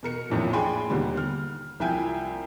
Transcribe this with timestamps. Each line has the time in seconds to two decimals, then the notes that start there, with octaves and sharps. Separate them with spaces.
0.03 B2 A#4 C#7
0.30 A#1 F2 A2 D#3 F3
0.53 D4 G#4 G5 G#5 B5 C6
0.90 D#2 B2 D3 G3
1.17 F6
1.80 C2 F3 E4 G5 G#5 G6